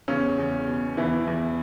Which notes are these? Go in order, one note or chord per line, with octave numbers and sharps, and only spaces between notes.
E2 C#3 C#4
E2
B2
E2 E3 E4
E2